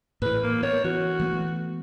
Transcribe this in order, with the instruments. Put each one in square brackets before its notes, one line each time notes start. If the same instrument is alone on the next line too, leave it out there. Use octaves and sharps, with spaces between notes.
[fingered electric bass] A2 E3 [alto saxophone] B4
[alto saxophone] A#3
[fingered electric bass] B3 [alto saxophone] C#5
[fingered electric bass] E3 [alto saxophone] F#4
[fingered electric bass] E3 A3 B3